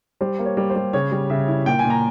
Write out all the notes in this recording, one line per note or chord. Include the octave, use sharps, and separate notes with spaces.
G3 C5
A#3
C#5
G3
C5
G3
C#3 C#5
G3
C#3 E5
E4
A#2 G5
G#5
A#2
A#5